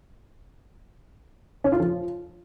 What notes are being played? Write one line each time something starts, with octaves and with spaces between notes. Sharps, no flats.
C#4
F4
F3